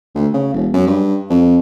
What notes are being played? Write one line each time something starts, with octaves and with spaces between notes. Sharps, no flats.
D2
C#3
E1
F#2
G2
F2